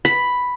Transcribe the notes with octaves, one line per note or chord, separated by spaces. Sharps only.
B5